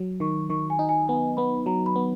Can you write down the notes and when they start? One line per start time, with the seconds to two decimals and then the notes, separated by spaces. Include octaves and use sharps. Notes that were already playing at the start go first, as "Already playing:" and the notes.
Already playing: F#3
0.20 D#3 C#6
0.50 D#3 C#6
0.70 G#5
0.79 D#4
0.89 G#5
1.08 B3 G#5
1.37 B3 B5
1.66 F#3 A#5
1.86 B5
1.96 B3